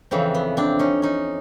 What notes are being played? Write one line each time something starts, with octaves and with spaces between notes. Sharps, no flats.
F2 C#3 E3 C4
B3
C4 D4
C#4 D#4
C#4 D#4